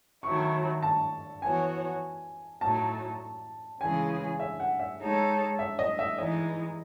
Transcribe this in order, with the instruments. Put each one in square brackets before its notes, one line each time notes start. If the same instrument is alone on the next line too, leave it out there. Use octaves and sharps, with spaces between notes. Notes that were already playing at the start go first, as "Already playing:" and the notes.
[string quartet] D#3 F#3 A3 E4 [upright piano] C#6
[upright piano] A5
[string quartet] E3 B3 F#4 C#5 [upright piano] G#5
[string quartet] A2 F#3 A3 D#4 [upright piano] A5
[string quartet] C#3 E3 G#3 C#4 G#4 [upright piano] G#5
[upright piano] E5
F#5
E5
[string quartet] G#3 D#4 A4 C#5
[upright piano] E5
D#5
E5
[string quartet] E3 G#3 D#4 [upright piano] D#5